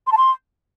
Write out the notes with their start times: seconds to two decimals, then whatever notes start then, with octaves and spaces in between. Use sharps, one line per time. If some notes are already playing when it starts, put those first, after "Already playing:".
0.07 C6
0.12 A5
0.17 C6